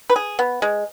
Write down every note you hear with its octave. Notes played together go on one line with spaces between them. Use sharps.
B4
G#4
B3
G#3